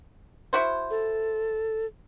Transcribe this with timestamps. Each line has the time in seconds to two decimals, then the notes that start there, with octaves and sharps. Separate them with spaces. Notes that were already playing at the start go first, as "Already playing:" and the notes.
0.53 E4 F#4 C5
0.90 A4